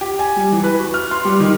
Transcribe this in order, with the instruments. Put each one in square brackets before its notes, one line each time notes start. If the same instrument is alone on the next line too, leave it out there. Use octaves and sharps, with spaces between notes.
[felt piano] G4
G#5
G3
E3
B4
F#4
F6
C6
G3
D#3